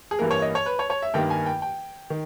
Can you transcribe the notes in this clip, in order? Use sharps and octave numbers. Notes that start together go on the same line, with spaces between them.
G#4
G2 E3 A#3 A#4
C#5
D#5
C#5
B4
C#5
C#5
E5
G2 D#3 A#3 G5
G#5
G5
G5
D#3